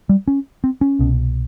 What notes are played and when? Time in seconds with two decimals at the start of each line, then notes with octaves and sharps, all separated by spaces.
0.09 G3
0.28 C#4
0.64 C4
0.81 C#4
0.99 C2 B2